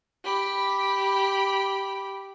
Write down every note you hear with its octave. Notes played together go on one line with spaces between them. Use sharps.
G4 B5